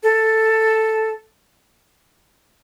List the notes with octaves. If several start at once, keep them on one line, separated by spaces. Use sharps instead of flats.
A4